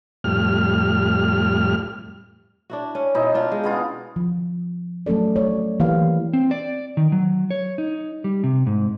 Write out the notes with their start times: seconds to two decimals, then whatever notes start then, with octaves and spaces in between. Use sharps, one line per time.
0.24 F2 A2 G3 F6
2.70 D4 E4 F#4
2.95 C#4
3.15 B2 D#4 E4
3.34 D4 F4
3.52 G#3
3.63 C#3 B3 F4
4.16 F3
5.06 F#3 A3 C#4 A4 D5
5.36 F#3 C#4 C#5 D5
5.80 E3 A#3 G4 B4 F5
6.33 C4
6.51 D5
6.97 D#3
7.12 F#3
7.51 C#5
7.78 D#4
8.24 G3
8.44 C3
8.66 G#2